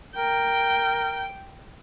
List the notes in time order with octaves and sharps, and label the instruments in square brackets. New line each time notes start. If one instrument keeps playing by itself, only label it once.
[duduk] A#4 [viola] G5